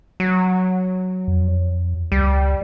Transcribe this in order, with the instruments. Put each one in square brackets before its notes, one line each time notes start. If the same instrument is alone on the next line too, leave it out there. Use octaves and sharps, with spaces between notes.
[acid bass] F#3
[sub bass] F2
[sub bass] C#2 [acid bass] G3